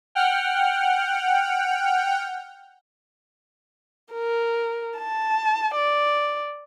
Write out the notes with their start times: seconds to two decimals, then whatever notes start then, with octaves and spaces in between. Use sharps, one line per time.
0.15 F#5 G5 F6
4.13 A#4
4.99 A5
5.74 D5